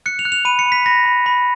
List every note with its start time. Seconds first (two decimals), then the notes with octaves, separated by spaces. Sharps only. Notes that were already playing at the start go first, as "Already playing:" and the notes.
0.06 F#6 C#7
0.19 F7
0.25 F#6
0.32 F7
0.45 B5 D#7
0.59 C#7
0.66 B5
0.72 B6
0.86 B5 A#6
1.06 B5
1.26 B5